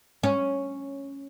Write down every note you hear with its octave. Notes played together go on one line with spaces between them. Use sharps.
C#4